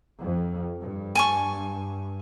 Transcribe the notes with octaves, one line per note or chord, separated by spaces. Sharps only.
F2
G2
G#5 A5 C#6